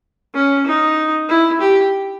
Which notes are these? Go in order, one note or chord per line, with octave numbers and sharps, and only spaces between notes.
C#4
D#4
E4
G4